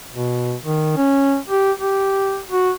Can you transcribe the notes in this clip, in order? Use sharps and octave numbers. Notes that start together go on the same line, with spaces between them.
B2
D#3
C#4
G4
G4
F#4